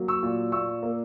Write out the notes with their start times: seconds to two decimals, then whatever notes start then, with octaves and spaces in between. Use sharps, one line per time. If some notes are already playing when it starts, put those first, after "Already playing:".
Already playing: F#3 A#3
0.08 C#6 E6
0.23 A#2
0.52 A#2 C#6 E6
0.82 A#3